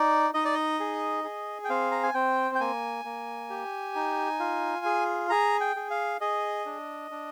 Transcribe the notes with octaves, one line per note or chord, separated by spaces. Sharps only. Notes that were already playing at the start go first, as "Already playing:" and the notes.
Already playing: D#4 D5
D#4 D#5
D5
D#5
G#4
G#4
G5
C4 F5
A#5
G#5
C4 G5
G5
A#3 G#5
A#3
G4
D#4
F4
G#4
G#4 A#5
G5
G#4
F5
G#4 D#5
D4
D4